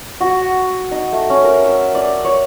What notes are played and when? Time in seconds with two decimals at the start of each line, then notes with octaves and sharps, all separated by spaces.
0.20 F#4
0.91 D#4
1.12 A3
1.30 C#4
1.44 A#4
1.64 E5
1.95 D5
2.25 C#5